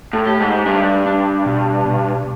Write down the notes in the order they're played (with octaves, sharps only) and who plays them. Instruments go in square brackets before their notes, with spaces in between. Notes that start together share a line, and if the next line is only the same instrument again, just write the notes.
[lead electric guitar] A2
[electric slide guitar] G4
[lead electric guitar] G#2
[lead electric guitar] G2 [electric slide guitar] D4
[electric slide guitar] D4
B2
B2